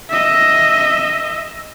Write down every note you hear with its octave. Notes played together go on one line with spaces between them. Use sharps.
D#5 E5